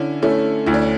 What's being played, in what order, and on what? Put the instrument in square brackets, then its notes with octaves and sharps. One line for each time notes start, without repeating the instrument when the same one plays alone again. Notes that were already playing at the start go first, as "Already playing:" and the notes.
Already playing: [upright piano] D3 [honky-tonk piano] C#4 E4
[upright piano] A3 [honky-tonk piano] C#4 E4
[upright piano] D2 [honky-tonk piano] E4
[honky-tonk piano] D4
C#4